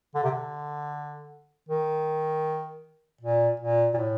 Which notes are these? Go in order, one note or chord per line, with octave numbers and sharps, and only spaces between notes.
D3
C3
D3
D#3
A#2
A#2
A#2
A2